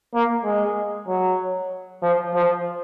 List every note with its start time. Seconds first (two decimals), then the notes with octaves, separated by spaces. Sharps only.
0.14 A#3
0.44 G#3
1.08 F#3
2.02 F3
2.34 F3